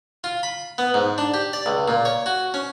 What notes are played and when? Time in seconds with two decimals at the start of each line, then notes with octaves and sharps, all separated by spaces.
0.24 F4
0.43 B5
0.78 B3
0.94 G#2
1.18 D4
1.34 G4
1.53 D5
1.66 C#2
1.88 A#2
2.05 C#5
2.26 F#4
2.54 C#4